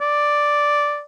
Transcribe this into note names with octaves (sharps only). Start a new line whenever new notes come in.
D5